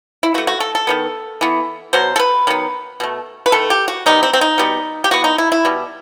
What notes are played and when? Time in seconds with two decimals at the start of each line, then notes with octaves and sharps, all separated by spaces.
0.23 E4
0.34 E3 A3 F#4
0.47 F#4
0.60 A4
0.75 A4
0.87 D#3 F#3 B3
1.41 E3 B3
1.93 B2 F#3 C5
2.16 A4
2.19 B4
2.47 D#3 F#3 B3
3.00 B2 A3
3.46 B4
3.52 D#3 A3 A4
3.70 G4
3.88 F#4
4.06 D#3 G3 B3 D#4
4.23 C4
4.33 C4
4.41 D#4
4.58 B2 G3 B3
5.04 G4
5.11 E3 B3 F#4
5.24 D#4
5.38 E4
5.52 E4
5.65 B2 G3